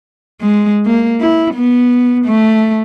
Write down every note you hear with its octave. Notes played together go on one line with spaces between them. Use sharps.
G#3
A#3
E4
B3
A3